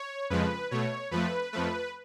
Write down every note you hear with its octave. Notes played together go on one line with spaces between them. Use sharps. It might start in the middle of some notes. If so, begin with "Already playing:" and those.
Already playing: C#5
F2 C#3 F3 G#3 B4
B2 A3 C#5
F2 F3 A3 B4
F2 F3 A3 B4